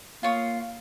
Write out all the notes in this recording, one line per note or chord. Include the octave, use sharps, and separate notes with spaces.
A#3 F4 C#5 F5 D#6